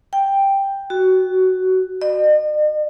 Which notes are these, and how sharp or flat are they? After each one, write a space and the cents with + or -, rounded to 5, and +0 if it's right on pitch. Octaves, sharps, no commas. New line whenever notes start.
G5 +5
F#4 +10
D#5 -45